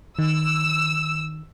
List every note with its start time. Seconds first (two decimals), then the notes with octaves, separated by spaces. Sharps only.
0.19 D#3 E6